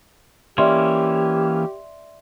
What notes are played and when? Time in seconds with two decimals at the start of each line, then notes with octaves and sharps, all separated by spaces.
0.58 E3 A#3 C#4 G4 D5 E5 C6